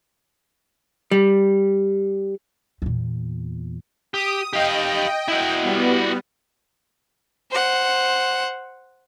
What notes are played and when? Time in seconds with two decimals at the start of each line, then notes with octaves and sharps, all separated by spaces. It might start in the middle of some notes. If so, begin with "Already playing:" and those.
1.11 G3
2.82 E2 A#2
4.14 G4 D#6
4.53 G4 D#5 F5 G5
5.28 E4 F#4
5.61 G3 B3
7.51 C5 F#5